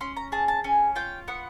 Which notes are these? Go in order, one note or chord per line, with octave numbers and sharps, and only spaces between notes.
C#4 C6
A#5
G#4 A5
A5
C#4 G#5
F4 G5
B3 F#5